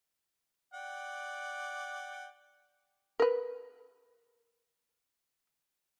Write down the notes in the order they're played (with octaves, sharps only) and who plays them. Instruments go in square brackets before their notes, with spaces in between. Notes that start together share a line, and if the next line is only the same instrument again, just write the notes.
[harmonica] D5 F#5 G5
[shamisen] A#4 B4